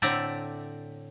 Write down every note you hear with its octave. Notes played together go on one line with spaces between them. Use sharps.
A2 D3 C4 D5 E5 A#5